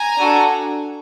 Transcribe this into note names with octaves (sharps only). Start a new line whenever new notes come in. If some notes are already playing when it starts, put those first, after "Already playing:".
Already playing: G#5 A#5
D4 F#4 A4